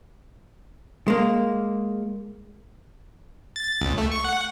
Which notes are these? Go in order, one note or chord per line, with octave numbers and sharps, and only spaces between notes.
G#3 A#3
A6
C#2
A3
C#6
F#5